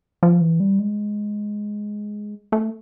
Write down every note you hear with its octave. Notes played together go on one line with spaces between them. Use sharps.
F3
E3
G3
G#3
A3